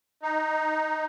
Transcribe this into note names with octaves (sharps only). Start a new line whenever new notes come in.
D#4